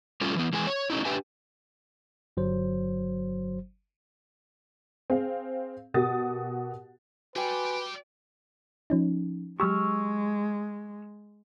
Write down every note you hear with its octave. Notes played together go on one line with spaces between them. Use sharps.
G3 A3 C#4 F4
E3 B3
E3 G#3 G#5
C#5
A3 C#4 D#4 E4
D4 G4 B4 E5 G#5
G1 F#3 C5
C4 G#4 F5
B2 F#4 G4 A#4 D#6 A6
F#4 G4 B4 D5 G5 G#5
F3 C#4 D#4
F#3 G#3 G4 C#6 E6 F6